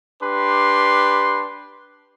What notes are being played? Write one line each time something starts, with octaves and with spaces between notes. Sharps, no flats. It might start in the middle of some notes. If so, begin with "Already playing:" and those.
D4 G4 B4 C6